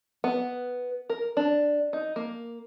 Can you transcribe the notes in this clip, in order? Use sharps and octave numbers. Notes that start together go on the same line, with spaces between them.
B3
A#4
D4
D#4
A#3